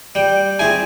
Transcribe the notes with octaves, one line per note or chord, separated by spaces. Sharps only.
G3 G5
C4 E4 G#4 G#5